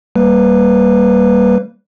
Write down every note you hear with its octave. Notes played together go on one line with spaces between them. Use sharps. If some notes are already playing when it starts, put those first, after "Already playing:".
G3 A#3 B4